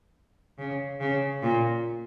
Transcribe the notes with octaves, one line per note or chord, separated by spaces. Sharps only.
C#3
C#3
A#2